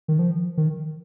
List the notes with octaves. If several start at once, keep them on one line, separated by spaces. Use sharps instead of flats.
D#3
F3
D#3